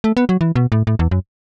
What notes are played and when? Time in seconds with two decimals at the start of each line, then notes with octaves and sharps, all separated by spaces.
0.04 A3
0.17 B3
0.29 F#3
0.41 E3
0.56 B2
0.72 A2
0.87 A2
0.99 E2
1.11 F#2